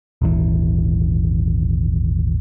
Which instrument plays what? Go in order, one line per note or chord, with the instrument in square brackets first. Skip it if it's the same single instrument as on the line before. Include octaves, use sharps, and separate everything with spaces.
[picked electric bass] D#1 G#1 E3